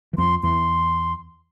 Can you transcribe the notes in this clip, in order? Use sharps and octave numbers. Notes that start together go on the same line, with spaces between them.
E3
F2 F3 C6
E2 E3 C6